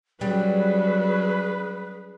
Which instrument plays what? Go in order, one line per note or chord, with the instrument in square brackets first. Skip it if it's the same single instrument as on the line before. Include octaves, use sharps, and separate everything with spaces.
[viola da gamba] F#2 F#3 [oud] G3 [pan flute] G#4 [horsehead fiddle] B4